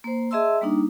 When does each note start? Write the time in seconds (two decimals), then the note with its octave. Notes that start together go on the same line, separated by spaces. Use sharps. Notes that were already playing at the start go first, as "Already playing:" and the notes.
0.04 A#3 C5
0.31 G#4 D#5 E5 A5 C6 E6
0.61 G3 A#3 D4 D#4